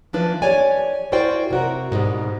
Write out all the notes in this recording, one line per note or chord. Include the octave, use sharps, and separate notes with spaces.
E3 F3 D4 B4
G4 C#5 D5 G#5
E4 F#4 A#4 C5 D5 G5
C3 F#4 A#4
G#2 B2 G3